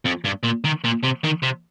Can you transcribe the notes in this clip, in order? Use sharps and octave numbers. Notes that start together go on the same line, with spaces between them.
F2
G2
A#2
D#3
A#2
C3
D#3
C3